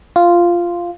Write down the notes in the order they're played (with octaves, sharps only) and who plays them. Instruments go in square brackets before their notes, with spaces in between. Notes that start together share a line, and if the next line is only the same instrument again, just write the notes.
[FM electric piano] F4